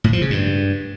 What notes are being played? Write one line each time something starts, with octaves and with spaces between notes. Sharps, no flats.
A2
F3
C#3
G2